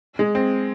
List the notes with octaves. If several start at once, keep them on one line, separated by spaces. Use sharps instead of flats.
G#3
C4